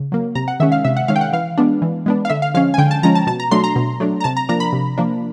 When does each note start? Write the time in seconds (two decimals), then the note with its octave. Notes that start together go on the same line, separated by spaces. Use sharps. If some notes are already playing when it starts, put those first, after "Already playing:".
Already playing: C#3
0.12 F#3 A#3
0.35 C3 A#5
0.48 F#5
0.60 D#3 G#3 C#4 E5
0.72 F5
0.85 C3 E5
0.97 F#5
1.08 D#3 G#3 C#4 F5
1.16 G5
1.21 F#5
1.33 E3 F5
1.57 G#3 B3 D4
1.82 E3
2.06 G#3 B3 D4
2.25 F5
2.30 D3 E5
2.42 F5
2.54 F3 G#3 C#4 F5
2.74 G#5
2.78 D3 G5
2.91 A5
3.03 F3 G#3 C#4 A#5
3.15 A5
3.27 B2 A5
3.40 A#5
3.51 F#3 A3 D4 C6
3.64 A#5
3.76 B2
4.00 F#3 A3 D4
4.20 A#5
4.24 C3 A5
4.37 A#5
4.49 F3 A#3 D4 A#5
4.60 B5
4.73 C3
4.98 F3 A#3 D4